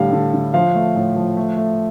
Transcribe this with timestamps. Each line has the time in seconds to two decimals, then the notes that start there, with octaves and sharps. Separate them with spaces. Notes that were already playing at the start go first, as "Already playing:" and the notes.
Already playing: A2 D3 G3 F5
0.13 D3
0.34 D3
0.54 F3 F5
0.75 A3
0.96 A2
1.16 F3
1.37 A3
1.57 A3